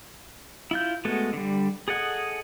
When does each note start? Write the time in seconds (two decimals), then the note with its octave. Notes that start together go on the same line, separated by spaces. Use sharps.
0.71 E4 F4 G6
1.05 G#3 A3 B3 F#4 A4
1.33 D3 G3
1.88 G#4 A4 D#5 F#5 G#5